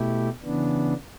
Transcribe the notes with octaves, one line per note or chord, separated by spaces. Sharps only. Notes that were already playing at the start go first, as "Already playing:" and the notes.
Already playing: B2 A3 E4 G4
C#3 E3 B3 D4